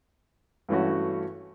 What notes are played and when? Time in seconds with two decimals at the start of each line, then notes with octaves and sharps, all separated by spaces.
0.69 G2 E3 A3 C#4 F#4